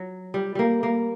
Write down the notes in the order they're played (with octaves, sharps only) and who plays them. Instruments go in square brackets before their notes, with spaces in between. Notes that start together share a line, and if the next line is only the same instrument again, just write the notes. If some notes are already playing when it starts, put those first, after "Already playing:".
Already playing: [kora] F#3
G3
G3 A#3
A#3